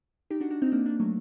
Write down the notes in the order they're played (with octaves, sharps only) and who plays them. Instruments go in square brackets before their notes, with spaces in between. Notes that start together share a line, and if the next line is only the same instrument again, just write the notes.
[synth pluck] D#4 G4
D4 F#4
D4 F#4
C4 D#4
A#3 D4
A#3 D4
F#3 A3